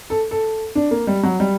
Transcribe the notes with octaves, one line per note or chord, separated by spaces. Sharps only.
A4
A4
D4
A#3
G3
F#3
G3